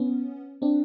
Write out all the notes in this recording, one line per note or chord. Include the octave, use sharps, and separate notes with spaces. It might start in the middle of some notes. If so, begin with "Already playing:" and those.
Already playing: B3 C#4
C4 D4